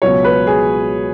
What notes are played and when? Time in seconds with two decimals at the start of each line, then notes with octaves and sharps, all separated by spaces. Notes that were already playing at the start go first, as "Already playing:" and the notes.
0.02 C#2 B2 F#3 C#5
0.24 B4
0.47 G#4